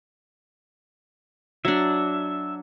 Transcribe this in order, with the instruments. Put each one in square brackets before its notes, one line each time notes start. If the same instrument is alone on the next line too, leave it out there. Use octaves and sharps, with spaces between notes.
[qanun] F#3 D4 [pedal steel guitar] E5